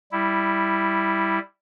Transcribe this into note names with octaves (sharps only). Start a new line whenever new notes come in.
G3 E4